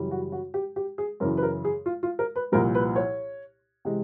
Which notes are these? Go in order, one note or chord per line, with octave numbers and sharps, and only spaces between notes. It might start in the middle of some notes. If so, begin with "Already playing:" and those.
Already playing: F#2 C#3 E3 G3
F#4
F#4
G4
G4
G#4
F#2 C#3 E3 A#4
B4
A#4
G#4
F4
F4
A#4
B4
C2 A#2 F3 A#4
B4
C#5
C3 E3 G#3